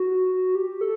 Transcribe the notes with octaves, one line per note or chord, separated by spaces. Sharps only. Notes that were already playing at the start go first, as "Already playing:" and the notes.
Already playing: F#4
G4
A4